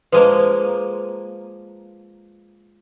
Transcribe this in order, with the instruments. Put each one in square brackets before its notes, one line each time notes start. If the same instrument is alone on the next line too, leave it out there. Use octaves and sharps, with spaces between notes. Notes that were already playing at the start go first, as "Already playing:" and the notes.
[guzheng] F3 G#3 A#3 [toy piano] B4